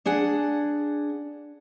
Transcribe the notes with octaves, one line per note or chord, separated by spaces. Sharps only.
D4 G#4 F#5